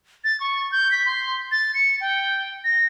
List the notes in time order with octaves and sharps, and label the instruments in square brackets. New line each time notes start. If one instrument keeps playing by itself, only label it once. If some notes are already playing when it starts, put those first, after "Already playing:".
[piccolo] A6
C#6
G6
B6
C6
A6
C#7
G5
A#6